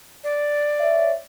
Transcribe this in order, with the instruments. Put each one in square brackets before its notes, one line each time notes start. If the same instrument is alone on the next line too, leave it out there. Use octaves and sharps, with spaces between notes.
[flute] D5
[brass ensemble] C#5 E5